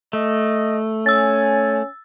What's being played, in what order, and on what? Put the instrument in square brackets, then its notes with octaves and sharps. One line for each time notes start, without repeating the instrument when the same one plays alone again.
[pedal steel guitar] A3 [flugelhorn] D#5
[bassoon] C#4 [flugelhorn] G#5 [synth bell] E6 A6